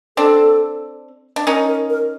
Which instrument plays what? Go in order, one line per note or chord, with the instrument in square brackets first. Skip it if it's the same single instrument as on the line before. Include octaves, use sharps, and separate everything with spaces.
[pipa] C4 D4 [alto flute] A4
[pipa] D4
[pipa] C#4 D#4 [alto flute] A#4
[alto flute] A#4
A#4